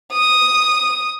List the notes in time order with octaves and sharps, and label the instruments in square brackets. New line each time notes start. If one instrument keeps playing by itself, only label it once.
[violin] D#6